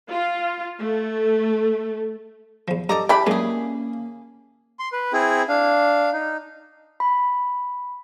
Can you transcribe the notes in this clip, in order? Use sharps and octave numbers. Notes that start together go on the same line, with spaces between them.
F4
A3
E2 F3
G2 G4 A4 D#5 A#5 D6
E3 G3 D4 D5 B5
F#2 C#3 G#3 A#3 C#4 G#4
C6
B4
C4 E4 G#4
D4 F5
D#4
B5